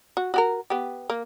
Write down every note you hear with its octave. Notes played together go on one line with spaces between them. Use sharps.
F#4
F#4 G4 A#4
B3 G4
A#3